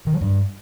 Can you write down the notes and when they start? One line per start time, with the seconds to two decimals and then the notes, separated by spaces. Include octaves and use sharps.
0.07 D#3
0.14 F#3
0.21 G2